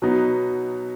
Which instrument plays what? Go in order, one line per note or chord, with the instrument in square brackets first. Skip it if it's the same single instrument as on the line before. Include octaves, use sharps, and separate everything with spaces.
[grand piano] B2 F#3 B3 D#4